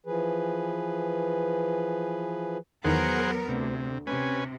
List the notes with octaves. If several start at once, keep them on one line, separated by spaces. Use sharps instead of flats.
E3 F3 G#4 B4
E2 D#3 F#3 B3 G#4 A#4 C5 F#5
D2 C3
C3 C#4 B4 G#5